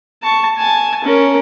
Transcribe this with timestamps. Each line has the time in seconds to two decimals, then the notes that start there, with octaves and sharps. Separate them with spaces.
0.23 A5 C#6
0.58 G#5 A5
1.04 C#4 A#4